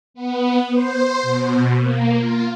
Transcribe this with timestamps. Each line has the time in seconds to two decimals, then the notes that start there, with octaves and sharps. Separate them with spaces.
0.14 B3
0.74 C5
1.22 B2
1.78 A#3
2.19 F4